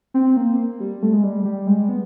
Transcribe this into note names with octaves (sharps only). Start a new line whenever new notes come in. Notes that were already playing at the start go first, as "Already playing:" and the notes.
C4
A#3
G3
A3
G#3
G3
G3
G#3
B3